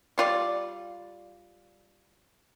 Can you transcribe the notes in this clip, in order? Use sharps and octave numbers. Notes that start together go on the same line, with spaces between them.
G3 F4 D5